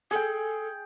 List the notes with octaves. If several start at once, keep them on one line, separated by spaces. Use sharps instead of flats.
G#4 A4 G5